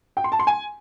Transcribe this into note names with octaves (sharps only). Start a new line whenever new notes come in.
G5
C6
A5
C6
G#5